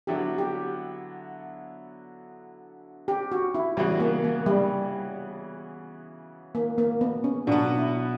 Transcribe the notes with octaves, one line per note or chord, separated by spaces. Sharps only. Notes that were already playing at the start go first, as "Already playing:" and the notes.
D3 F#3 B3 E4 G4
G4
G4
F#4
E4
C#3 E3 G3 B3 F#4
A#3
A#3
G3
A#3
A#3
B3
C#4
B2 F#3 B3 D4
E4